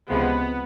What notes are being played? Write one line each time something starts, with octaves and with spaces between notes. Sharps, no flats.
C#2 C3 F3 G#3 B3